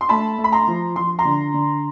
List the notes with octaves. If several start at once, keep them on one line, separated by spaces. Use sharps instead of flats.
C6
A3 A5 B5
A3
B5
A#5 C6
F3
F3 C6
A#5 C6
D3
D3